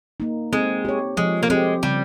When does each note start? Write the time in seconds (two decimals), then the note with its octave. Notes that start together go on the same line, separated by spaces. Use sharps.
0.20 A#3 D#4
0.53 G#3 C4
0.85 G4 C#5
1.17 F3 G#3
1.43 A#3
1.50 G#3 C4 G4
1.83 C#3 G3